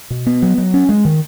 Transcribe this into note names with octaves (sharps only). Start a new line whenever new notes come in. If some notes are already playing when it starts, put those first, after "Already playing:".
B2
B3
F#3
F#3
C#4
G#3
D#3